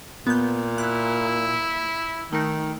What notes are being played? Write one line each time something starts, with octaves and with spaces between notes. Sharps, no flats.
A#2 B3 G6
E4 F#6
D#3 A3 D#4